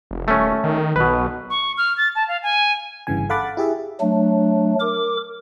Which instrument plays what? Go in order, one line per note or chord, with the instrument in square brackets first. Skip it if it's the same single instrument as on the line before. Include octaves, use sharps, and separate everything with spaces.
[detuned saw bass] F1
[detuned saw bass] D#1 [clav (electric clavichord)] A3 C#4
[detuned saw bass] D#3
[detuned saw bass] B1 [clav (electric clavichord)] B2 B4
[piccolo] C#6
F6
A6
A5
F5
G#5
[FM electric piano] G1 G2 C#3 E3 G#5
A4 F5 F#5 B5 D6 A6
E4 G4 G#4 E5
[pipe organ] F#3 A3 D4
A#4 D6